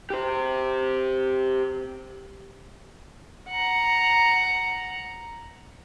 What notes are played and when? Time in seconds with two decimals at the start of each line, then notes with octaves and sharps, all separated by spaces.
0.10 G4 C5
3.49 F#5 A#5